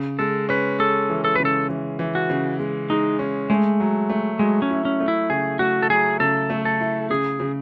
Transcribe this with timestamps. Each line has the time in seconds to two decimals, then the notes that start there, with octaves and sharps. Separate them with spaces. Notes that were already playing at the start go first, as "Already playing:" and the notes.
Already playing: C#3
0.19 G#3 A4
0.49 C#4 B4
0.79 G#3 A4
1.10 E3
1.25 A4
1.36 B4
1.40 C#3
1.45 A4
1.69 E3
1.99 E3
2.15 F#4
2.30 C#3
2.59 G#3
2.90 G#3 D#4
3.19 C#4
3.50 G#3 A3
3.80 F#3
4.10 A3
4.39 F#3 G#3
4.62 C#4
4.70 E4
4.85 C#4
5.00 A3
5.08 E4
5.30 C#3 G#4
5.59 A3 F#4
5.82 A4
5.90 F#3 G#4
6.20 C#3 A4
6.50 A3
6.65 A4
6.81 E4
7.10 C#3 G#4
7.40 C#3